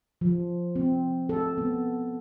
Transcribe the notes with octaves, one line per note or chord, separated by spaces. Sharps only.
F3
C4
A4
B3